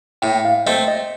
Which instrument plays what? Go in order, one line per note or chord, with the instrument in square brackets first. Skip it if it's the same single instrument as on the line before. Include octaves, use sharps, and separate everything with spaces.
[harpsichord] A2 [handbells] G5
[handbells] F5
[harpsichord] A3 C4 [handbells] D#5
[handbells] D#5